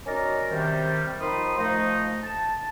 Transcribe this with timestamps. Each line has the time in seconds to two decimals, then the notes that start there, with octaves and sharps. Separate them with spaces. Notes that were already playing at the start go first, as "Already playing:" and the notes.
0.06 C#4 D#4 F#4 A#4 D5 A#5
0.50 C3 D#3 G3
1.20 D#3 F3 D#4 B5 C6 D#6
1.58 F3 A3 D#4
2.23 A5